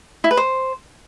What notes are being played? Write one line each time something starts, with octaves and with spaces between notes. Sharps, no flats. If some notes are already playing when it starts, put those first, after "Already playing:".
E4
B4
C5